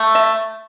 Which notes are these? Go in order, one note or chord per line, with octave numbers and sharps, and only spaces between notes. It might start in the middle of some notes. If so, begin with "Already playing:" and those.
Already playing: A3
E5